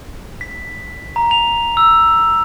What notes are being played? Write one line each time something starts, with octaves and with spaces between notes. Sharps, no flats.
B6
A#5
F7
E6